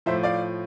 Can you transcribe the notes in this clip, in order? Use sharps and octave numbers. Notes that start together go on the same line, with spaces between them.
A2 F3 C5 E5
D5 F5